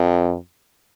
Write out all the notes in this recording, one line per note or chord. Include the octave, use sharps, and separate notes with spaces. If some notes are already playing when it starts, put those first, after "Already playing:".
Already playing: F2